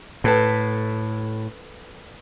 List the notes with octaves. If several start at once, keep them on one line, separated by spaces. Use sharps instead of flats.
A2 A4 B4 A5